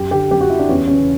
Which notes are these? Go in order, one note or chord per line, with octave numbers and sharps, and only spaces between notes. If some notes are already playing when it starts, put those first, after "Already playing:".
Already playing: F#2 G4
D3 G4
F#2 G4
F#4
D3 E4
D4
E2 C#4
C#3 E3 C#4